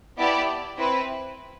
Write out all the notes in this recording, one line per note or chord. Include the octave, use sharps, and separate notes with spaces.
B3 E4 G4 D5 A5
C4 E4 B4